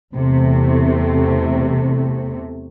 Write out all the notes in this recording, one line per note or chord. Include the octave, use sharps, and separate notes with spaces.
E2 C3 A3